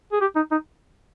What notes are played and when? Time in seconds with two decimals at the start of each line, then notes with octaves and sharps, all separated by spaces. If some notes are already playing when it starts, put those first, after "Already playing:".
0.12 G#4
0.21 G4
0.36 D#4
0.51 D#4